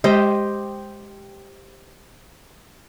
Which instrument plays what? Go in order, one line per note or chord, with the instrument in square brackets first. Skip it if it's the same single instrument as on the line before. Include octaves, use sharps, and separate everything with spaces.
[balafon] G#3 [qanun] G4 C5 D#5